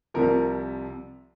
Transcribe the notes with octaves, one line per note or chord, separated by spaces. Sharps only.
C2 C3 F3 A#4